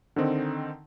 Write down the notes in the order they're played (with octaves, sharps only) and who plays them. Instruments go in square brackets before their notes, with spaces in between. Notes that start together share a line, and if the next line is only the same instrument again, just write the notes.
[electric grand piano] D3 D#3 C4 D#4